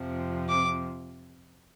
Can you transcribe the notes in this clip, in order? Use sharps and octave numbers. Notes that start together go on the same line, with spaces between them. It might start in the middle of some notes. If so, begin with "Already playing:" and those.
Already playing: F2 C3 F3
D6